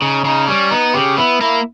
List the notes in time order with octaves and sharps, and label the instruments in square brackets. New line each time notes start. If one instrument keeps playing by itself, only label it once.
[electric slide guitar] C#3 [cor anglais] D#4
[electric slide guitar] C#3 [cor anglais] D#4
[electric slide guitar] G3 [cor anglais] C#4
[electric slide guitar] B3 [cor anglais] D#4
[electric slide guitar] C#3 [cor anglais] G4
[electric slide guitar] B3 [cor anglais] E4
[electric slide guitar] A#3 [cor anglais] E4